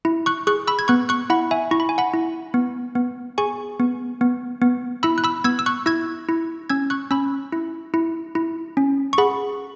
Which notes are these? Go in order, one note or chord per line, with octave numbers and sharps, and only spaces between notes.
E4
C#6 F#6
G#4 C#6 F#6
B5 E6
G#6
B3 C#6 F#6
C#6 F#6
E4 F#5 B5
E5 G#5
E4 C#6
B5
G#5
F#5 B5
E4
B3
B3
G#4 G#5 C#6
B3
B3
B3
E4 B5 E6
F#6
B5 E6
B3 E6 G#6
E6
C#6 F#6
E4 E6 G#6
E4
C#4 E6 G#6
C#6 F#6
C#4 B5 E6
E4
E4
E4
C#4
C#6
G#4 F#5 B5